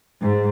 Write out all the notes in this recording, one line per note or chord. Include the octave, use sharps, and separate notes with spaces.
G#2